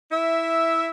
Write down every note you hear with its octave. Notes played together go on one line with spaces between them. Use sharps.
E4 E5